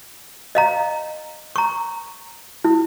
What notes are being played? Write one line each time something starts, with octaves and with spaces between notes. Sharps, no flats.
D#5 F5 A#5
A#5 C#6
E4